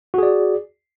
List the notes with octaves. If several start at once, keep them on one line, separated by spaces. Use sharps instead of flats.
F#4 G#4 D5